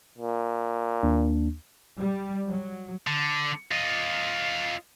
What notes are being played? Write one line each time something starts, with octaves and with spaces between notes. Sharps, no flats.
A#2
D#2 A#3 D4
G3
F#3
D3
F4 D#5